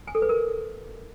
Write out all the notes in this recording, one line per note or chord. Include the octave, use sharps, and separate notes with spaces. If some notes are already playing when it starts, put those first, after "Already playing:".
G#5
A4
B4
A#4